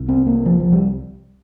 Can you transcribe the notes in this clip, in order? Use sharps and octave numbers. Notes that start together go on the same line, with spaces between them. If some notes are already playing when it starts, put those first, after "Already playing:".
Already playing: C2 C3
C4
A#3
F3
F3
G3